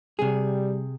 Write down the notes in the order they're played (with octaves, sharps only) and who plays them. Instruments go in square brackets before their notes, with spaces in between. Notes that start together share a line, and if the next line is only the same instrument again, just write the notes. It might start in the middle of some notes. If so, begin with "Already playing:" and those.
[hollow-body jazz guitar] C3 G#4 [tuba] G3